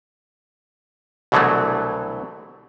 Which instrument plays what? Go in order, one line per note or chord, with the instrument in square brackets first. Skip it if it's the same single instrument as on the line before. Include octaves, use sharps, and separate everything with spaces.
[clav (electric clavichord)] C2 B2 D3 E3 F#3 A3